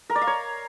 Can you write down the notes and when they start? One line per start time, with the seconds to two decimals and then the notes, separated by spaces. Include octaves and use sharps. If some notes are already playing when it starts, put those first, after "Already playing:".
0.10 A#4
0.16 D5
0.21 F5
0.27 C#5